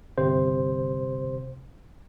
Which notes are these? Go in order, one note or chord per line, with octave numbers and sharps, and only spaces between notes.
G1 C3 C5